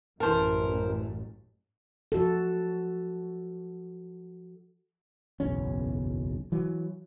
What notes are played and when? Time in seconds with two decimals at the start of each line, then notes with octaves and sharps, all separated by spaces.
0.20 A1 F#2 E3 A#4 C5 A5
2.12 F3 F#4 A4
5.40 F#1 B1 E2 C#4
6.52 E3 F#3